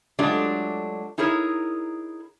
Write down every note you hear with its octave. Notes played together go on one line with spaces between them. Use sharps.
F#3 G#3 A3 D4 F4 G4
D#4 E4 G#4 A#4 C#5